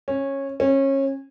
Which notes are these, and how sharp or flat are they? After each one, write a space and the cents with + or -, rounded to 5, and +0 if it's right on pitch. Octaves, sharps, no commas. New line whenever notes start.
C#4 -15
C#4 -25